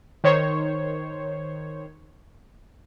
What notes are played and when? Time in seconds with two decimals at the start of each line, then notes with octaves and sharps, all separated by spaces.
0.24 D#3 C5 C#5